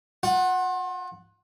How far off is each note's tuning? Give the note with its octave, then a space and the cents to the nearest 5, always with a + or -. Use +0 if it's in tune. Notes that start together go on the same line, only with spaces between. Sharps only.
F4 +35 F#5 +0